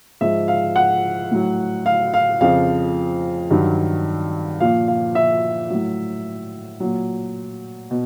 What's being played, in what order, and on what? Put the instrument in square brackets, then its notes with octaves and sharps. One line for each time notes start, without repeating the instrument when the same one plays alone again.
[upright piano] G#2 F3 E5
F5
F#5
A2 F#3
F5
F5
F2 C#3 F3 F5
G2 D#3 F#3
A#2 F3 F5
F5
E5
A2 F#3
A#2 F#3
B2